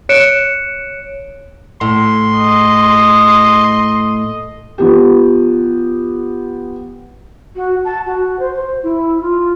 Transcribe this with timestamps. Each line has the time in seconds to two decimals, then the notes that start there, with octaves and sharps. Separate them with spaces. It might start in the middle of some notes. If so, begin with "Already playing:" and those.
0.09 C#5 F#6 C#7 D7 E7
1.81 A2 C6
2.36 D#5
4.78 F3 B3 G4
7.55 F#4
7.84 A5
8.05 F#4
8.39 C5
8.53 C5
8.82 E4
9.21 F4